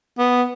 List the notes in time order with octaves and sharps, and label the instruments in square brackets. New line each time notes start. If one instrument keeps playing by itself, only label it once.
[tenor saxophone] B3